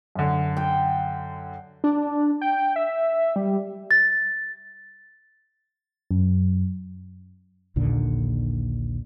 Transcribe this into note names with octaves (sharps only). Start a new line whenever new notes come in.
F#2 D3
G5
D4
G5
E5
G3
A6
F#2
A#1 D#2 A#2 D3